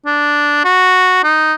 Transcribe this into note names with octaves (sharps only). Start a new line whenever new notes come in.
D4
F#4
D#4